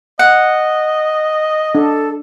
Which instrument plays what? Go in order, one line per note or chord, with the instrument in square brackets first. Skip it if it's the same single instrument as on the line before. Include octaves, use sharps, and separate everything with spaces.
[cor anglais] D#5 [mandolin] F#5
[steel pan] D4 [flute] A4